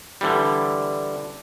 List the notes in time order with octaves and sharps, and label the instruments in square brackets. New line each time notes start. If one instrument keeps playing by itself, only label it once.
[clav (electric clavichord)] D3 E3 G3